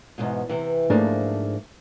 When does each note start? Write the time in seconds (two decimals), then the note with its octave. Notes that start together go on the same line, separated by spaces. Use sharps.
0.18 E2 G#2 B2
0.49 C3 E3
0.90 G#2 F3 A3 A#3 D4